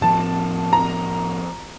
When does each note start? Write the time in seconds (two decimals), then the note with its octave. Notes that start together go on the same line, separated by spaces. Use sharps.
0.01 A2 F3 C4 A5
0.73 A#5